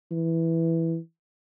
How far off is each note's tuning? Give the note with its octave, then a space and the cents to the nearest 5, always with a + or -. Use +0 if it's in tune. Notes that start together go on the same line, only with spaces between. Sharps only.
E3 +0